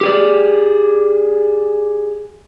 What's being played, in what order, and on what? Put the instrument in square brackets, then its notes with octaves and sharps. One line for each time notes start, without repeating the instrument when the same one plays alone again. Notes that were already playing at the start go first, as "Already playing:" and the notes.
[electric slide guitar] G4 G#4 D5